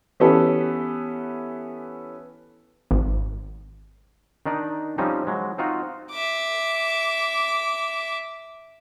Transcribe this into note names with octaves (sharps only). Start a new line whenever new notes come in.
E3 B3 C#4 G4 A4 B4
G#1
D#3 D4 D#4 D5
F3 G3 C4 C#4 D#4
F#3 G#3
C4 D#4 F4 F#4
E5 D6